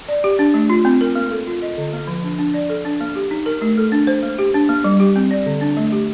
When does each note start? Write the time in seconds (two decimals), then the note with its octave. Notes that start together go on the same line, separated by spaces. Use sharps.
0.09 D5
0.24 G4
0.39 D4
0.54 A3
0.70 F4
0.85 C4
1.01 A#4
1.16 A#3
1.31 A4
1.47 F4
1.62 D#5
1.78 D3
1.93 A#3
2.08 F3
2.24 D4
2.38 D4
2.54 D5
2.69 A4
2.85 D4
3.01 A#3
3.16 G4
3.31 D#4
3.46 A#4
3.62 A3
3.78 A4
3.92 D4
4.07 C5
4.23 A#3
4.39 G4
4.54 D4
4.69 A#3
4.84 G3
5.00 G4
5.16 C4
5.31 D5
5.46 D3
5.61 D4
5.77 A3
5.92 G4